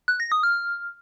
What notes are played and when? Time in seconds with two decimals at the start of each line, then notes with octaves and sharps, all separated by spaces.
0.08 F#6
0.20 A#6
0.32 D#6
0.43 F6